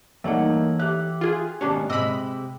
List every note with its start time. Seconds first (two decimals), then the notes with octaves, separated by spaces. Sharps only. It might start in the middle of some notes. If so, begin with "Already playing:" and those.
0.24 E3 G3 A3 A#3 D#4 A4 C#5 F#5
0.79 G4 E5 F#6
1.21 F4 G#4
1.61 D#2 G#2 B2 C#4 D4 G4
1.90 C3 G#3 D#5 B5 E6